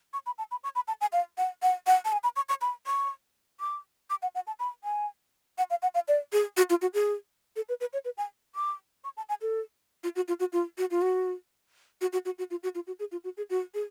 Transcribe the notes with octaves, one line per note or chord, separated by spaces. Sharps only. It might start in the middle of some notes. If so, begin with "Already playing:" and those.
C#6
B5
A5
B5
C#6
B5
A5
G#5
F5
F#5
F#5
F#5
A5
G#5
B5
C#6
C#6
B5
C#6
D6
D6
F#5
F#5
A5
B5
G#5
F#5
F5
F#5
F5
D5
G#4
F#4
F4
F#4
G#4
A4
B4
B4
C#5
B4
G#5
D6
C#6
A5
G#5
A4
F4
F#4
F4
F#4
F4
F#4
F4
F#4
F#4
F#4
F#4
F#4
F4
F#4
F4
F#4
G#4
F4
F#4
G#4
F#4
G#4